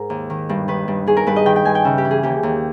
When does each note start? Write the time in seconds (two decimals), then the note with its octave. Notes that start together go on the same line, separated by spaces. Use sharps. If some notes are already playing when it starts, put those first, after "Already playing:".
Already playing: G#2 G#4 A#4
0.10 D#2
0.30 D#3
0.49 G2
0.68 D#3 B4
0.88 G2
1.07 D#3 G#4
1.17 A#4
1.27 G2 B4
1.36 D#5
1.46 D#3 G5
1.56 G5
1.65 G2 G#5
1.75 G5
1.85 C#3 E5
1.98 G4
2.05 E3
2.11 G#4
2.23 D#2 G4
2.43 D#2